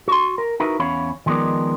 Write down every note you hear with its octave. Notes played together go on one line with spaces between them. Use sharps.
F#4 C6
A#4
D#4 E4 F#4 A#4 B4
E2 C#4 C#5 F5 B5
D#3 F3 G#3 B3 A#4 D5